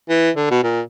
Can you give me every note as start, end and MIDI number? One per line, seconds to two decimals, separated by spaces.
0.09 0.31 52
0.37 0.48 50
0.51 0.62 47
0.63 0.81 46